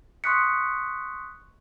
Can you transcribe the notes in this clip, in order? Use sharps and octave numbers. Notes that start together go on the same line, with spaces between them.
C6 C#6 D#6 F#6 B6 C#7